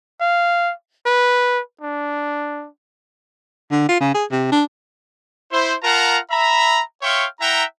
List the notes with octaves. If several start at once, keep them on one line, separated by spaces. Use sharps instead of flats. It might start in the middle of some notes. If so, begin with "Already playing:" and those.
F5
B4
D4
D3
F4
C#3
G#4
C3
D4
E4 C5
F4 A#4 F5 F#5 A5 A#5
E5 A#5 B5
C#5 E5 F5 G5 C6 C#6
E4 E5 F#5 G5 A#5